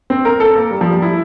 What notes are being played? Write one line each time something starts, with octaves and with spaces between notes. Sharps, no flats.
C4
A#4
A4
A#3
G3
F3
G3
E4